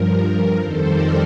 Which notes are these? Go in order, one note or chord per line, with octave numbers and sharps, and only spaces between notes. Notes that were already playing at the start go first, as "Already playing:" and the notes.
Already playing: G2 F3 A#4
F2 D#3 G3 A4 C5
A#4 D5